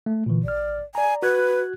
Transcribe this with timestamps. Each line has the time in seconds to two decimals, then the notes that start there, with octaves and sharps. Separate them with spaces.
0.06 A3
0.26 A#2 D3 E3
0.44 A1 D5 F6
0.95 D5 G#5 A#5
1.23 F#4 B4 F#6 G#6